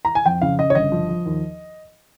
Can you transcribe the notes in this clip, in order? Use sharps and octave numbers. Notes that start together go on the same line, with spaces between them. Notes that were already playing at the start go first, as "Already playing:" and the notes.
A#5
G#5
F2 G5
C#3 F5
C#3 D#5
C#5
G1 D#5
F3
F3
D#2